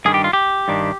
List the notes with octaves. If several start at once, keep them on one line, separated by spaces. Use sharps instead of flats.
G2 D#3 G3 D4 G#4
G4
F4
G4
G2 D#3 G3 D4